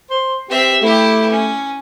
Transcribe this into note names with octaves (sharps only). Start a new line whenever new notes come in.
C5
C4 G4 E5
A3 E4 G4
C#4